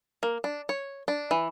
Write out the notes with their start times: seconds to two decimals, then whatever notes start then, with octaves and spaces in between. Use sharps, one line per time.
0.23 A#3
0.44 D4
0.69 C#5
1.08 D4
1.31 E3